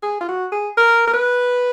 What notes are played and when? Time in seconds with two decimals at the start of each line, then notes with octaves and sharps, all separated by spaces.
0.03 G#4
0.21 F4
0.28 F#4
0.52 G#4
0.77 A#4
1.07 A#4
1.13 B4